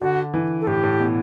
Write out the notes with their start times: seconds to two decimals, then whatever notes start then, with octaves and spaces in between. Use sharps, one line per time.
0.01 D3 F#4
0.34 E3
0.61 A4
0.67 A2 G4
0.83 A2
0.99 B2